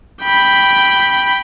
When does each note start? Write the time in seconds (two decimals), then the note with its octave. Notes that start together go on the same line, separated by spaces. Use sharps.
0.23 G5 B5